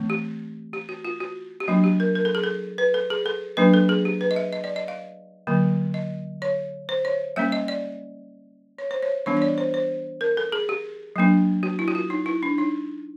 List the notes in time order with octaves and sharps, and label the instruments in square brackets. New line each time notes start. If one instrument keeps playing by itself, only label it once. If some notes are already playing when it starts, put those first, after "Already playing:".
Already playing: [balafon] E3 A3 C4
G4
G4
F#4
F4
F#4
G4
F#3 A#3 D4 F#4
G4
A#4
A#4
A4
G#4
A4
B4
A4
G#4
A4
F#3 A#3 D4 B4
A4
G#4
G4
B4
D#5
E5
D#5
D5
D#5
F5
D3 F#3 A#3
D#5
C#5
C5
C#5
G3 A#3 C#4 E5
D#5
D5
C#5
C5
C#5
E3 G3 B3 D4 C#5
C#5
D5
C5
C5
A#4
A4
G#4
G4
F#3 A#3 D4
F#4
E4
F#4
F4
D#4
E4
D4
D#4